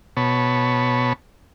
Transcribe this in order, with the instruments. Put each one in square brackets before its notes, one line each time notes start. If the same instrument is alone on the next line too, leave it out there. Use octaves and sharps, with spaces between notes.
[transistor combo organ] B2 C#5 A5 B5